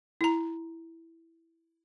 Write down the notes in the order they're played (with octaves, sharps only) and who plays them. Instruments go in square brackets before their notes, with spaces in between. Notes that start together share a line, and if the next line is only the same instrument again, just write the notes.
[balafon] E4 A#5